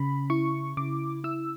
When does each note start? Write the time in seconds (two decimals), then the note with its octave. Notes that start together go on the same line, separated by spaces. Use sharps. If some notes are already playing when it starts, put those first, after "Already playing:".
Already playing: C#3 C#4 B5
0.30 E4 C#6
0.77 C#3 D6
1.24 E4 E6